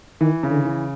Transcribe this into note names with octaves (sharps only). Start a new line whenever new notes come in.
D#3 E3
C#3
D3
E3